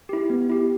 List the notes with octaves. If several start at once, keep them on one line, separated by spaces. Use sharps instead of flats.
E4 G4
B3
E4 G4